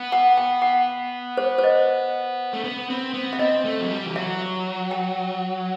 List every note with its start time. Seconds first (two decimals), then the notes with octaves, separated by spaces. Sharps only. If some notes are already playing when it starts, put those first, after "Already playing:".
Already playing: B3
0.12 F#5
0.37 G5
0.62 F#5
1.37 C5
1.58 C5
1.64 D#5
2.53 A3
2.64 B3
2.90 C4
3.14 B3
3.33 E5
3.39 C4 D#5
3.65 A3
3.81 F#3
3.90 G3
4.06 E3
4.15 F#3 E5
4.91 G5